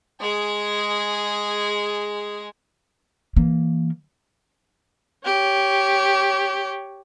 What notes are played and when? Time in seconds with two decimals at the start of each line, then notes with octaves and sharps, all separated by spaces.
0.20 G#3 G#4
3.36 E3 A#3
5.26 G4 C#5